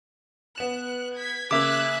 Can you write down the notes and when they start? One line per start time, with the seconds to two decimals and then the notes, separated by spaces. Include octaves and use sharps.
0.58 B3 F#6 E7
1.17 G#6 B6
1.51 C#3 A#3 E5 D6 E6 F#6 G#6